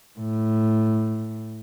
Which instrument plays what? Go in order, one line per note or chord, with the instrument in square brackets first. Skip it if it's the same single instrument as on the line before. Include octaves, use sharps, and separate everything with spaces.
[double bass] A2